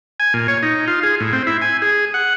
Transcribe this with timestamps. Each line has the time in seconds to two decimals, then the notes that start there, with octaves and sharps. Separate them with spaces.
0.20 G#5
0.34 A#2
0.48 C#5
0.63 D#4
0.88 F4
1.03 G#4
1.20 A2
1.33 C4
1.47 E4
1.62 G#5
1.82 G#4
2.14 F#5